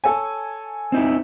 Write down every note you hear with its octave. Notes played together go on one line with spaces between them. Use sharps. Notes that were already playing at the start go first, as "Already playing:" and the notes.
A4 C#5 G#5
C4 D#4 E4